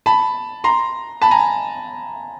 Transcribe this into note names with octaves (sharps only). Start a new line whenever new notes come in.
A5 B5
A#5 C6
A5 B5
G#5 A#5